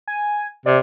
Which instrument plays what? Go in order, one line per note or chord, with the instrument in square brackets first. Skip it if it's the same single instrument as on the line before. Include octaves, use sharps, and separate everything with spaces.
[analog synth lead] G#5
[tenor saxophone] C3 [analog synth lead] D5